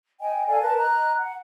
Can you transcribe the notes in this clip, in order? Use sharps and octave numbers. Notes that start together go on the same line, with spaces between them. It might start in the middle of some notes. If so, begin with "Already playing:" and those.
D#5 G5 G#5
A4 D5 F5 G#5
A#4 B4 A5
D#5 A#5 F#6
F#5